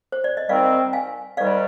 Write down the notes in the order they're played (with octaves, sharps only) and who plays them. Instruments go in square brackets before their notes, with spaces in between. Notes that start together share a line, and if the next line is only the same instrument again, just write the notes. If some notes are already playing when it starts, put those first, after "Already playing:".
[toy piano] C5
D5
D#5
[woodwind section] G#2 D#3 G3 C4 [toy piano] D5 F5
[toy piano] F5 G#5
[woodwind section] G#2 D#3 G3 [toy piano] D5 F5